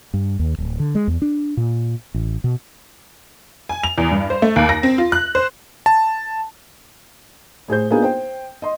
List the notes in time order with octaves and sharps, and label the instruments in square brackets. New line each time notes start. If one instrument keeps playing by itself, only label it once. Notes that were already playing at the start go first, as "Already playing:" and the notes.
[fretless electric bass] G2
D#2
D1
D3
G#3
E2
D4
A#2
A1
B2
[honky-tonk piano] G#5
F7
E2
G2
C5
A3
D#2
A#6
C4
F4
F#6
C5
[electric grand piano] A5
[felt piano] A2 G#4 C5 G6
A#3 B3 D4 D#4 F4 G#4
C5 G5
D#5 C6